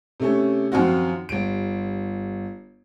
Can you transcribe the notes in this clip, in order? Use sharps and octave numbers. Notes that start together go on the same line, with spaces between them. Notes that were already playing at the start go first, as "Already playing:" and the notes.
C3 A3 C#4
F#2 D#3 F3 C4 F4 F#4
G1 D7